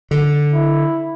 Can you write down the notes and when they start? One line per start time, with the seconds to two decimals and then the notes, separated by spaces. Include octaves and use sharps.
0.11 D3
0.53 E4